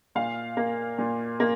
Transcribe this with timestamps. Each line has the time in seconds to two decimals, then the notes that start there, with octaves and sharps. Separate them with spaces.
0.15 A#2 F5
0.57 A#3
0.98 A#2
1.40 A#3